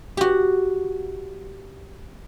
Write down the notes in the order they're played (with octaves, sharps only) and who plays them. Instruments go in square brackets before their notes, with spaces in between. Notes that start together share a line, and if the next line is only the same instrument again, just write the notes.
[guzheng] F#4 G4